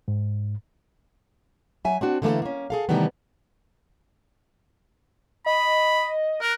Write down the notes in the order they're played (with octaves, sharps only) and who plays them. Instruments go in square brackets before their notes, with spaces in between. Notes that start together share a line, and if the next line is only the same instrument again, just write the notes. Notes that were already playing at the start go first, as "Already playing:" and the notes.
[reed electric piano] G#2
[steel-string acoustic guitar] F#3 E5 G#5
C4 D4 F#4
D3 E3 A3 A#3 A4
A#3 C#4
G#4 A4 F5
C3 D#3 E3 G3 A3 B3
[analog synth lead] D#5 [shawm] B5
[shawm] A#4 [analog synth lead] F#6